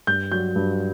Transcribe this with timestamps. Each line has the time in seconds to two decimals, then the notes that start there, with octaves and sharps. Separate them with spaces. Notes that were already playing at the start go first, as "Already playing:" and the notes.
0.07 G2 G6
0.32 F#3 G6
0.56 G2